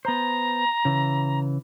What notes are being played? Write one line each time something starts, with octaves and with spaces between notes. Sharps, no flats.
B3 C5 A#5
C#3 E3